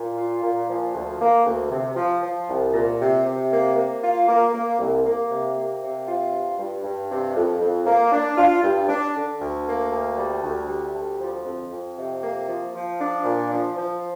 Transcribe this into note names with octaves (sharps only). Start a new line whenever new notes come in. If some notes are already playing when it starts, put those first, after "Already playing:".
Already playing: A#2
F4
A#2
F3
D2
A#3
D2
C3
F3
F3
C2
A#2
C3
C3
A#3
A#3
F4
A#3
A#3
C2
A#3
C3
A#3
C3
F4
G2
G2
G2
C3
F2
F2
A#3
D4
F4
G2
D4
D3
D2
A#3
D2
G3
D2
G3
D2
F3
F2
F2
C3
A#3
F3
F3
D4
A#2
F3
F3